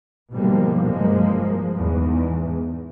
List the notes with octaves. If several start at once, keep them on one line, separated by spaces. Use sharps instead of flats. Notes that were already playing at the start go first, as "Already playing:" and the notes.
G#2 B2 D3 F3 G3 A#3
F#1 G2 F3 G#3 A#3
E2 G#2